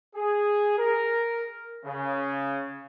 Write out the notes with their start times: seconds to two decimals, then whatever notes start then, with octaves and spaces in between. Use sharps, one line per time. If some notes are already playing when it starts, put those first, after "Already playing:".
0.15 G#4
0.78 A#4
1.85 C#3